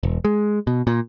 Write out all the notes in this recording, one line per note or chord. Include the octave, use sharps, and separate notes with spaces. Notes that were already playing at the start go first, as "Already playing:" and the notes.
E1
G#3
B2
A#2